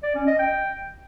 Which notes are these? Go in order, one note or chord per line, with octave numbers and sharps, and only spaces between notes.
D5
C#4
D#5
G5